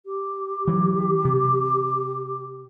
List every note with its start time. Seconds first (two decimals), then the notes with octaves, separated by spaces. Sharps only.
0.05 G4
0.68 E3 F#3
1.25 C3